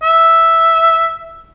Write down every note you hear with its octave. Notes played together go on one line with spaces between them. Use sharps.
E5